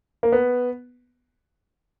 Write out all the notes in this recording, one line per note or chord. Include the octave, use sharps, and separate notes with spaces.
A#3
B3